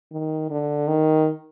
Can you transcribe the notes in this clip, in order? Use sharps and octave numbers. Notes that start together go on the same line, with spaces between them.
D#3
D3
D#3